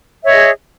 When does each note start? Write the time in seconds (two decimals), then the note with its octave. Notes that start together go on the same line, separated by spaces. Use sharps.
0.23 E5
0.25 C#5
0.28 D#5
0.30 G#4